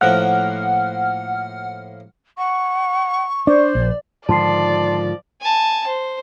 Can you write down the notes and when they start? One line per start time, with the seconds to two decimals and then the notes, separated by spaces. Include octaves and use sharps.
0.01 A2 F3 A#3 F#5 F6
2.38 F#5 C#6
3.47 D4 C5 D5
3.75 A#1
4.29 G#2 D3 D#3 F3 D5 A5 C6 C7
5.41 G#5 A5
5.87 C5